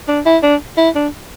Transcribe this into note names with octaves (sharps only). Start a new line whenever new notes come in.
D4
E4
D4
E4
D4